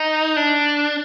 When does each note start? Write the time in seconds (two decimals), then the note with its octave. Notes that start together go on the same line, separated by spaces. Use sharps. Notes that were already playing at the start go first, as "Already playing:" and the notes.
Already playing: D#4
0.36 D4